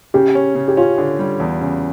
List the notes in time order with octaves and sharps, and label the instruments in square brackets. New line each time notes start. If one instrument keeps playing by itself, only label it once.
[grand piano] C#3 [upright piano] G4
[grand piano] C#4
C#3
[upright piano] G4
[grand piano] C#4 [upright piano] F4
[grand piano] D3
G3
E2
C#3